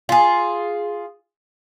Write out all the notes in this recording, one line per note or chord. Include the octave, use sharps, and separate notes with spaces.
F4 G#4